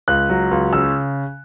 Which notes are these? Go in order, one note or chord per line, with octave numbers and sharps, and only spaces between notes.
C#2 F#6
F#3
C#2
C#3 E6